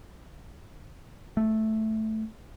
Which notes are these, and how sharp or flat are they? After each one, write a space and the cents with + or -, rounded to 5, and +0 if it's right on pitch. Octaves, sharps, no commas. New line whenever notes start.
A3 -5